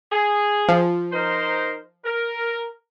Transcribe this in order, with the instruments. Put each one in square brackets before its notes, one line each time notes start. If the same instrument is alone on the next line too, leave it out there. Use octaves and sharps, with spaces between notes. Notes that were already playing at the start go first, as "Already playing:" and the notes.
[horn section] G#4
[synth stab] F3
[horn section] D#4 A#4 C5
A#4